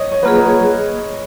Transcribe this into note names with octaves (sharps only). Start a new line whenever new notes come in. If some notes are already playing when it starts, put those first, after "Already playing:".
Already playing: C#5 D#5
C#5
F#3 A#3 F4 G#4 B4
B4
C#5